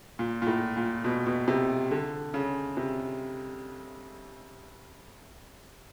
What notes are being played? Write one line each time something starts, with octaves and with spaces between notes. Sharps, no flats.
A#2
A#2
A2
A#2
B2
B2
C3
D3
C#3
C3